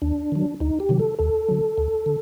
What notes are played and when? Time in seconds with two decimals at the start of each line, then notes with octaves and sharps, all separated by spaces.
0.02 D#2 D4
0.32 D#3 F#3
0.60 D2 D#4
0.80 G4
0.89 C3 D#3 F#3
0.99 A4
1.19 D#2 A4
1.49 D3 F#3
1.78 D2
2.06 D3